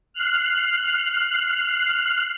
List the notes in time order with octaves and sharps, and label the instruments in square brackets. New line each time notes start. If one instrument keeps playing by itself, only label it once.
[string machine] F6 F#6 C7